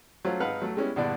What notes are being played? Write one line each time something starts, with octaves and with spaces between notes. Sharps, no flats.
F#3 A3 C#4 F4 C5
G#1 D#4 B4 F5 F#5 F6
F#3 A3
G3 G#3 B3 C#4 E4
A#1 G2 D3 B3 E4 D5